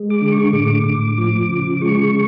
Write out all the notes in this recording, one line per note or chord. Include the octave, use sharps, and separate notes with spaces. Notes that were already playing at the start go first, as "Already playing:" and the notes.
Already playing: G#3
D6
D3
C#6
A2 D6
A2
F3
C#3
D6
G#3 C#6